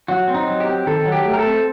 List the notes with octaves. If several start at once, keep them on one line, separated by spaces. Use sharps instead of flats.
F#3 F#4
C4
D#4
F#3
G4
C4
D#3 A4
F#3
G4
A3
A#4
A4
C4